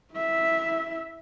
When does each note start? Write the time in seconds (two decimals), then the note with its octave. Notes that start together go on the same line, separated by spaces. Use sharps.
0.14 E4 E5